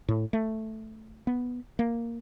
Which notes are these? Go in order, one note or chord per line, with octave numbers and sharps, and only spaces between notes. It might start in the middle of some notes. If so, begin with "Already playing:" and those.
A2
A3
B3
A#3